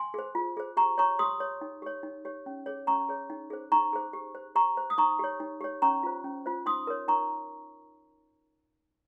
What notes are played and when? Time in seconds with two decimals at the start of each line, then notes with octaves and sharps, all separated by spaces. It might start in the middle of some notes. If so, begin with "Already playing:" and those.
Already playing: G#5 C6
0.14 G#4 C5
0.35 F4
0.57 G#4 C5
0.77 G4 A#5 C#6
0.98 C#5 A#5 C#6
1.19 G4 C6 D#6
1.40 C#5
1.61 D#4
1.82 G4 C#5
2.03 D#4
2.25 G4 C#5
2.46 C#4
2.66 G#4 C#5
2.87 C#4 A#5 C#6
3.09 G#4 C#5
3.30 D#4
3.50 G#4 C5
3.72 D#4 A#5 C#6
3.93 G#4 C5
4.13 G4
4.35 C5
4.55 G4 A#5 C#6
4.77 C5
4.90 D#6
4.98 D#4 A#5 C#6
5.19 G4 C#5
5.40 D#4
5.61 G4 C#5
5.82 C#4 A#5 C#6
6.03 F4 C5
6.24 C#4
6.46 F4 C5
6.66 D#4 C6 D#6
6.87 A#4 C#5
7.08 D#4 A#5 C#6